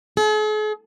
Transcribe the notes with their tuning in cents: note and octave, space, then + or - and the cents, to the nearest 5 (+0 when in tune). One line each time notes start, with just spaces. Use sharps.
G#4 +45